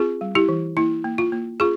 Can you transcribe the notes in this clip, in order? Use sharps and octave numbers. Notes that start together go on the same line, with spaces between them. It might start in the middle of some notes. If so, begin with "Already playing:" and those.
Already playing: C4 F4 G#4
G3
E4 G4
E3
A#3 E4
A#3
F4
A#3
C#4 F4 G#4